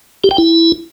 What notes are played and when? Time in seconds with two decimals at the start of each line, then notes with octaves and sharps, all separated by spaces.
0.24 G4
0.31 G5
0.38 E4